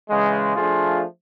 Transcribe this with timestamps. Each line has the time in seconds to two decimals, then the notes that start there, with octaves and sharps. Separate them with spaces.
0.10 C#3 E3 G#3
0.56 F3 A3 D4 F4 G#4